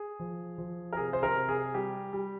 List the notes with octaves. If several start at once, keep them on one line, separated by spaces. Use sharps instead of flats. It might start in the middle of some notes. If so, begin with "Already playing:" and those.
Already playing: G#4
F3
F3
A#4
C3 G#4
C5
A#4
C3
G#4
G3 G4
G3